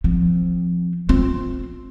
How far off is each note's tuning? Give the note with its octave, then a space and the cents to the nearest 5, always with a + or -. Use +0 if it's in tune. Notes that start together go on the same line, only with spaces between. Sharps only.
F3 +0 C4 +0
C4 +0 F4 +15